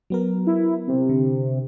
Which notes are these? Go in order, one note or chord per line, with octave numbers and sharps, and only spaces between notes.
F#3 B3 A#4
E4
C3
D3